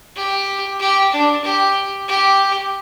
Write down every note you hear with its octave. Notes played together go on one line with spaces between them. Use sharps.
G4
G4
D4
G4
G4